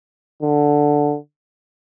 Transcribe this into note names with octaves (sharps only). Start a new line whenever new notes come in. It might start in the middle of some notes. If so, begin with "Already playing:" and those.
D3